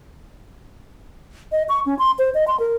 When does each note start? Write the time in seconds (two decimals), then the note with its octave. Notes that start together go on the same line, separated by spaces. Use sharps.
1.52 D#5
1.69 C#6
1.86 C#4
1.99 C6
2.19 C5
2.34 D#5
2.47 C6
2.60 A#4